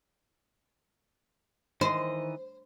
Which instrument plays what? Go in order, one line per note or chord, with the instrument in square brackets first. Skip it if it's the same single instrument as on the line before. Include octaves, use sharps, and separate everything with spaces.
[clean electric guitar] D#3 E3 D#5 [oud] C5